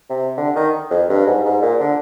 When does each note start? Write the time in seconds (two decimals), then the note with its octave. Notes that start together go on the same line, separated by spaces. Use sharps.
0.10 C3
0.37 D3
0.56 D#3
0.91 F2
1.09 G2
1.27 G#2
1.45 G#2
1.62 A#2
1.80 D3